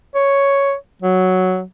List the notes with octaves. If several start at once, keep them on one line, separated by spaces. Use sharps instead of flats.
C#5
F#3